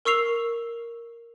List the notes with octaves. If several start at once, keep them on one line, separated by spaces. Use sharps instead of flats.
A#4 C#6 E6 C7 F7